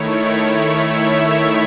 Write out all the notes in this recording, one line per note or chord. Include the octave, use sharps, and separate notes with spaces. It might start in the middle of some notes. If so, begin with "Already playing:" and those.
Already playing: D#3 A3 E4 C#5
E5
E5